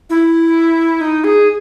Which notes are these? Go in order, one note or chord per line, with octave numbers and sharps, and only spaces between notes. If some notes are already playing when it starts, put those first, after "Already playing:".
E4
D#4
G#4